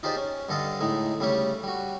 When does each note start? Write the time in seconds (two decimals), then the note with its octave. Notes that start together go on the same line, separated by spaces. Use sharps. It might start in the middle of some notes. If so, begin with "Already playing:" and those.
0.03 D#4 F4 G4 G#4 C5 D5
0.16 C#4
0.49 G2 D3 A4 D#5 F5
0.80 A2 G#3 D#4
1.20 C#3 G3 A3 C#4 G4 C#5
1.63 G3 F#4